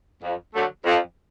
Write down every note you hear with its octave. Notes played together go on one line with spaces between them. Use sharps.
F2
D3 F#3 A3
F2